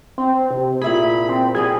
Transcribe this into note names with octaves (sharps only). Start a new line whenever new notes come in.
C4
C3
A#2 E4 G#4 B5
C4
F#3 G3 C#4 G#4